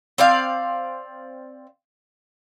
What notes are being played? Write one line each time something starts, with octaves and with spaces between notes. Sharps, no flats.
C4 D5 F5